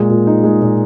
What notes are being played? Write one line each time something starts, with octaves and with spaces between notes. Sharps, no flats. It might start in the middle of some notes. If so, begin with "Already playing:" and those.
Already playing: A#2 G#3
A#2
D#4
G#3
A#2